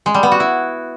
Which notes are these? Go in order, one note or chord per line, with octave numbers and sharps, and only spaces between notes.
G#3
G3
B3
F#4
E4